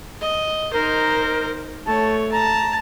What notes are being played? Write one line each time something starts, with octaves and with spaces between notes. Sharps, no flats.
D#5
D#4 A#4 C5
A3 C#5 A5
A5 A#5